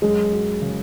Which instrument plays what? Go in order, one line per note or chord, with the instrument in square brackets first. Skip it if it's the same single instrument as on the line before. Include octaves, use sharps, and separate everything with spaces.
[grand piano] F#2 [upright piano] G#3
[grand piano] F#3
C#3